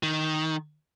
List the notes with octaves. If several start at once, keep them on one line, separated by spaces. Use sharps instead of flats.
D#3